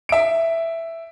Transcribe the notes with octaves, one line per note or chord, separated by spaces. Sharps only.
E5 D7